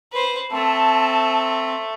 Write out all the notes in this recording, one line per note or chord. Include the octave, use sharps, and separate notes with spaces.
B4 C5
A3 C4 A5